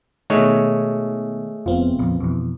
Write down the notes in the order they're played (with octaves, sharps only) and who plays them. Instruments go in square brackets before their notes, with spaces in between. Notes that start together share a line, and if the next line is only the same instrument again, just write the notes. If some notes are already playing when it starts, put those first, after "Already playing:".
[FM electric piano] B2 D#3 [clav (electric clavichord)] G#3 A3 C#5
[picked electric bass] F1 [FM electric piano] B3 C4 F4
[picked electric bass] A#1 F2
[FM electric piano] F2 [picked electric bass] B2 E3